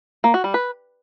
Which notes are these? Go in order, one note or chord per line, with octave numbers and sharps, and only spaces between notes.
A#3
F#4
G3
B4